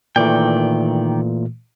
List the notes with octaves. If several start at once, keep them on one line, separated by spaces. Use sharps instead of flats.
A#2 D#3 E3 A3 D5 G5